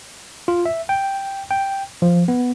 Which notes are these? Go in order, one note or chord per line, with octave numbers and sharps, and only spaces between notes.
F4
E5
G5
G5
F3
B3